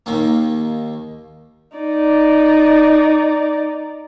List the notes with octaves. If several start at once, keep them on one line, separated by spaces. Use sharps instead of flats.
D#2 D#3 A#3
D#4 D5